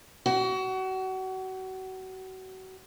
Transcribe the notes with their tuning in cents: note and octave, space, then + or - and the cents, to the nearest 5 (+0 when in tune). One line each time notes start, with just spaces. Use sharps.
F#4 +30